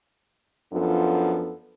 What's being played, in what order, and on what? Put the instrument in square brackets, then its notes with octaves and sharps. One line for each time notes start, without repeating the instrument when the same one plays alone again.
[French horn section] F#2 F3 B3 D4 F4 A4